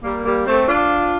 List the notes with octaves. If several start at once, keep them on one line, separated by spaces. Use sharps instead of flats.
G3 A#3
G3 A#3
A3 C4
D4 F4